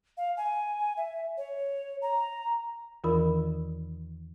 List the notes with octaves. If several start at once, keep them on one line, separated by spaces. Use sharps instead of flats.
F5
G#5
E5
C#5
A#5
E2 D#3 E3 F4 A#4 B5